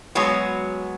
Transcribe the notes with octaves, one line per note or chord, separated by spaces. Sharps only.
F#3 G#3 B3 F#4 C#5